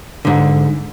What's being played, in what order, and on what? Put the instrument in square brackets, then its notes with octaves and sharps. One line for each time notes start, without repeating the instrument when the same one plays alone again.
[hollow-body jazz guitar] G#2 D3